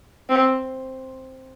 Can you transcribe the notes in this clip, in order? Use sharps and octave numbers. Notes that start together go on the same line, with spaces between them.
C4